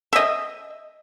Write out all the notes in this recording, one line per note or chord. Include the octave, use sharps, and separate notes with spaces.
D#5 E5